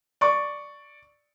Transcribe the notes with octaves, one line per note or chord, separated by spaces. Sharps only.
D5 C#6